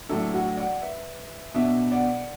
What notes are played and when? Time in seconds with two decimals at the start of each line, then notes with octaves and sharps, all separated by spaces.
0.09 A2 F#3 D4 E4 A4
0.34 F#4
0.57 D5 F#5
0.81 B4 E5
1.54 B2 B3 D4 B4 E5
1.91 D5 F#5